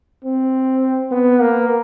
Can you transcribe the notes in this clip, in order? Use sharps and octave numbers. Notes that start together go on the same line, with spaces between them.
C4
B3
A#3